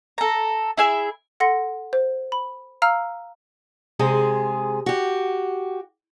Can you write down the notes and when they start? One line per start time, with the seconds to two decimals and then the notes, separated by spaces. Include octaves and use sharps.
0.18 A4 A#5
0.77 E4 G#4 E5
1.40 A4 F#5 C6 A#6 C#7
1.93 C5
2.32 B5
2.82 F5 A#5 E6 F6
3.99 C3 G#3 G#4
4.86 F#4 G4